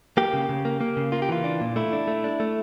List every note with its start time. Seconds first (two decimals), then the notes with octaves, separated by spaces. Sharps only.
0.17 A#3 G4
0.34 C#3
0.49 C#3
0.65 A#3
0.81 A#3
0.97 C#3
1.12 A#3 F4
1.22 G4
1.29 E3 F4
1.44 D4
1.61 A#2
1.76 A3 E4
1.93 D4
2.08 A3
2.24 D4
2.40 A3